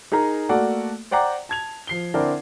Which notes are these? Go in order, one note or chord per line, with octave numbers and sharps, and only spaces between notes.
D#4 G#4 A#4 A#5
A3 A#3 F#4 A4 D5 F#5
C5 D5 F#5 G5 A#5 D6
A5 G#6 F7
F3 C7 G7
D3 C4 D4 E4 A#4